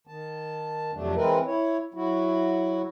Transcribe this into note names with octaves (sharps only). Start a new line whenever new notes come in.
D#3 A5
F2 C3 F#3 A3 D4
E3 G#3 C4 E4 A#4 B4
E4 C#5
F#3 E4 F#4